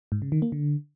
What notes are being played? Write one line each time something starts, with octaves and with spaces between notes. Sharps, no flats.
G#2
C#3
D#3
A#3
D3